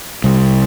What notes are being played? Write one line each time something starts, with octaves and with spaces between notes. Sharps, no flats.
C2